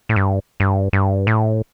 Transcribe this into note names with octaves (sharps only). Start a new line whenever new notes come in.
A2
G2
G2
G2
A2